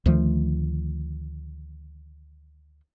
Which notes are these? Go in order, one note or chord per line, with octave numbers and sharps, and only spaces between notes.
D2 D#3 F3 A3